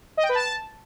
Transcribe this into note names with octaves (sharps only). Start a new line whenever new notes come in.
D#5
G5
B4
A5